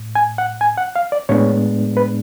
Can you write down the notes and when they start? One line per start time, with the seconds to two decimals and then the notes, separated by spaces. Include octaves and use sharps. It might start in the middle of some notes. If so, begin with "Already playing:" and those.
Already playing: A2
0.15 G#5
0.38 F#5
0.61 G#5
0.77 F#5
0.96 F5
1.12 D5
1.29 A2 G#3 B3 D4 C#5
1.97 B4